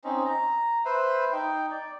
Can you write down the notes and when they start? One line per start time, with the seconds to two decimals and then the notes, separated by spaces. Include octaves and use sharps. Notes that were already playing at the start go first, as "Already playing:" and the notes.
0.04 C4 C#4 D#4
0.26 A#5
0.85 B4 C5 E5
1.32 D#4 G5
1.71 D5